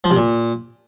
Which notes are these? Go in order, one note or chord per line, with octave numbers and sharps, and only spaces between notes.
F3
C3
A#2